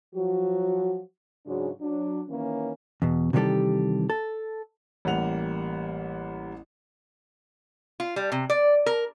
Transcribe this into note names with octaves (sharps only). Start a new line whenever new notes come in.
F3 F#3 F#4
G#2 C#3 F#3 G#3 D4 F#4
F#3 D4
D#3 E3 A#3 C#4
E2 B2
C3 D#3 E3 G3 G4 A4
A4
A1 G3 A#3 F#5 F7
F4
G3
C3
D5
A#4